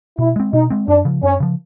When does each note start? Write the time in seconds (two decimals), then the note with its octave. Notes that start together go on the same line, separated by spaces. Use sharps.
0.18 B2 E4
0.36 G#3 C4
0.53 B2 D#4
0.70 G#3 C4
0.88 F#2 D4
1.05 C#3 F3
1.23 F#2 C#4
1.40 C#3 F3